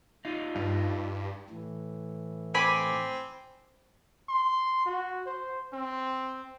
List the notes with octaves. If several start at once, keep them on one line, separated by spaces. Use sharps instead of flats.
D#4 F4
G2
A2 E3
C4 G#5 B5 D6
C6
F#4
C5
C4